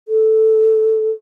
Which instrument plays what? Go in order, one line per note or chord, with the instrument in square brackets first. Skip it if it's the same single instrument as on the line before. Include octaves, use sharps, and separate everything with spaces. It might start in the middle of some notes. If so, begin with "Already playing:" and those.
[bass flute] A4